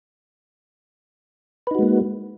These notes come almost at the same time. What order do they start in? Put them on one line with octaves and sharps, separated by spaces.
B4 D#4 F#4 G#3 A#3